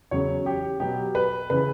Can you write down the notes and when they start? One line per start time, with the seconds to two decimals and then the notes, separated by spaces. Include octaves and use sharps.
0.11 E2 C#3 F#3 C#4 C#5
0.46 G4
0.80 B2 F#3 B3 G4
1.15 B4
1.50 C#3 E3 B4